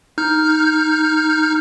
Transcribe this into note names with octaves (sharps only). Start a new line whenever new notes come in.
D#4 F6 G6